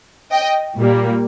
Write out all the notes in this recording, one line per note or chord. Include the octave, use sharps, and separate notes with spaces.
D#5 G5
A#2 G3 A#3